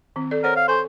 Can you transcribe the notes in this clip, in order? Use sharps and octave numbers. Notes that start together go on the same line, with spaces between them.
D#3 C4
A4 D5
A#4 C5 C#5 F#5
F5
A4 C5 G#5 C#6